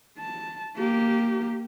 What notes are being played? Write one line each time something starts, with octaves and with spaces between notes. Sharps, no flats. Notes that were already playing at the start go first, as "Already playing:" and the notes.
A5
A#3 G4